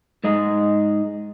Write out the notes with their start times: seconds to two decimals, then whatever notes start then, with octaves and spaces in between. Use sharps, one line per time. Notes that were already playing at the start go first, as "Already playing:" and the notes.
0.24 G#2 G#3 D#5